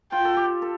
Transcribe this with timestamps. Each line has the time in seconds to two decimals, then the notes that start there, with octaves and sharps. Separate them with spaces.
0.12 F4 G5
0.25 A4
0.37 G4
0.62 A4